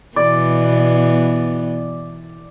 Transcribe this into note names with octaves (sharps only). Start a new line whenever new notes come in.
B2 E3 B3 D5